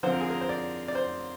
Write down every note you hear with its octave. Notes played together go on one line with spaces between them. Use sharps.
D3 F3 C4 C5
A#4
G#4
A#4
C5
D5
D5
C5